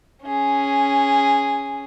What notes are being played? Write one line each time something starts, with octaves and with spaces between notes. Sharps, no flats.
C#4 G#4